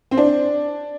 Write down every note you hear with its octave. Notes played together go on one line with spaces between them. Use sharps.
C4
D4